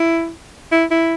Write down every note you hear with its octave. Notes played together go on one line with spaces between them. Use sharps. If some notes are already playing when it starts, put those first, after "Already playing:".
Already playing: E4
E4
E4